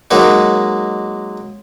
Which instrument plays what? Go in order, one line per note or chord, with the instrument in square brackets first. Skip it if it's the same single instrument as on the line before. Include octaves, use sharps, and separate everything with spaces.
[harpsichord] F#3 G#3 A#3 D#4